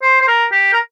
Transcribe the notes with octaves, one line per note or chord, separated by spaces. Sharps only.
C5
C5
A#4
G4
A#4